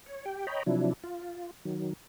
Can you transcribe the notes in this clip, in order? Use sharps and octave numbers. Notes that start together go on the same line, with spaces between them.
C#5
G4 G5
C#5 D#5 G5 A#5 B5
C3 F3 F#3 D4 E4
F4
D#3 F#3